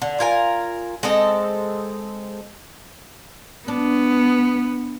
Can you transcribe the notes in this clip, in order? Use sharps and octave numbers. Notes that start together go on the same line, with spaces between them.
D3
F4 A#4 G#5
G#3 C4 A4 D#5
B3 D4